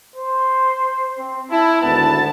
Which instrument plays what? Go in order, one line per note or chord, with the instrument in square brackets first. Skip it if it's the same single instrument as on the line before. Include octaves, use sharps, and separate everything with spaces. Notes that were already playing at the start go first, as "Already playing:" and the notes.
[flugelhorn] C5
C4
[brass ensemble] E4 [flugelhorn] A5
[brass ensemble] G#1 D2 A5 [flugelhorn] B3